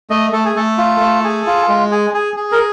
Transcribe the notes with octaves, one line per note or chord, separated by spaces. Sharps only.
A3 D#5
A3 A4
G#4
A3 A4
F4
A3
G#4
F4
G#3
G#4
G#4
G#4
A#4